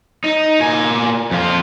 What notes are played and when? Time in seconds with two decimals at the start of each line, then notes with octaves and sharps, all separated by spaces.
0.24 D#4
0.60 A#2 G#5
1.31 F2 F4